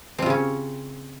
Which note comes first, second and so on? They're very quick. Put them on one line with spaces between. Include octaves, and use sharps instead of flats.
C4 F4 C#3 C#4